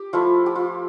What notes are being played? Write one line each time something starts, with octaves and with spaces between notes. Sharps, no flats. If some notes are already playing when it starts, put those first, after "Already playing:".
Already playing: G4
F3 A3 E4 F4
G4
F4